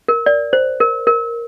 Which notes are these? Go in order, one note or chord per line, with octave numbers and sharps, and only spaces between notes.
A#4
D5
C5
A#4
A#4